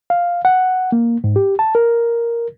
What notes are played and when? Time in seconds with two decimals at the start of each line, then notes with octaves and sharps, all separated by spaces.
0.10 F5
0.45 F#5
0.92 A#3
1.24 G#2
1.36 G4
1.59 A5
1.75 A#4